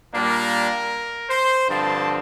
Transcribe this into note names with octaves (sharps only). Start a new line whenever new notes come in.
A#2 G3 A#3 D4 A#4
C5
G2 D3 F3 C4 A5